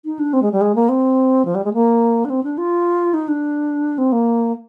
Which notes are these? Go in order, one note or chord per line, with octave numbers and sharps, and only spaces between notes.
D#4
D4
C4
G#3
G3
G#3
A#3
C4
F3
G3
G#3
A#3
D4
C4
D4
F4
D#4
D4
C4
A#3